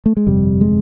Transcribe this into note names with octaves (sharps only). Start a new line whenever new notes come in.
A3
G#3
G1 F2 C3 G3
G#3